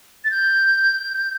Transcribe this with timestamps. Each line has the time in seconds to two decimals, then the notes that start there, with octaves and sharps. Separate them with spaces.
0.24 A6
0.31 G6